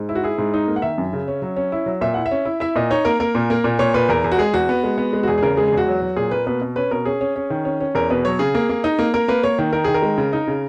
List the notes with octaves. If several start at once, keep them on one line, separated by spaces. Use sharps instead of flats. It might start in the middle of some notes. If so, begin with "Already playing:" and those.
Already playing: G#2
E4
F#4
E4 G#4
G#2
D#4
A#3
F#5
D#3 E5
F#2
C#3
C#4
F#3
C#4
E4
F#3
A#2 E5
E4 F#5
E5
C#4
E4
E4 E5
A#2 D#5
D#4 C#5
A#3 A#4
A#3 A#4
A#2
A#3
A#2
A#2 C#5
A#2 B4
E2 A#4
E2
F#4
G#3 G#4
E2 F#4
B3
G#3
B3
G#3
F#4
E2 G#4
G#4
C#3 A#4
G#3 G#4
G#4
E2 F#4
F#3
F#3
A#2 G#4
A#3 B4
B2 B4
B2
C#4 B4
B2 A#4
C#4 G#4
C#4
C#4
D#3
C#4
C#4
E2 A#4
B2 B4
F#3 C#5
C#3 G#4
A#3
A#3
D#4
A#3
A#3 A#4
A#3 B4
A#3 C#5
D#3
D#3 A#4
D#3 G#4
A#4
G#3
C#3
D#4
C#3